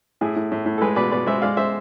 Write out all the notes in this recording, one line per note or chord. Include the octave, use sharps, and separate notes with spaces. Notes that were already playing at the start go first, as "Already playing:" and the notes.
A2 E4 G#4
A2
A2
A2
A4
G#3 G#4 B4
B2 B4 D5
B2 B4 D5
G#3 C5 E5
G#3 D5 F5
G#3 C5 E5